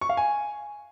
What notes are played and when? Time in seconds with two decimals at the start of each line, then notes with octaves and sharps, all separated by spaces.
0.01 C#6
0.09 F5
0.17 G#5